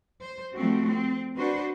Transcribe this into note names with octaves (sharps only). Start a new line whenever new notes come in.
C5
F3 G3 A3 C4 F#4
C4
D4 F#4 B4 C5